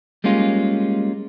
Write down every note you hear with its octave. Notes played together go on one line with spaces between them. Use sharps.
G3 G#3 A#3 C#4 F4